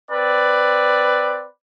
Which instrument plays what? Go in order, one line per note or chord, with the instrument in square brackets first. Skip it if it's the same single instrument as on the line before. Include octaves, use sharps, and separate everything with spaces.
[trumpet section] C4 B4 D5